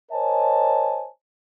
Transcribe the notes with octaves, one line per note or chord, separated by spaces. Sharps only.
A#4 C5 C#5 D#5 G#5 A5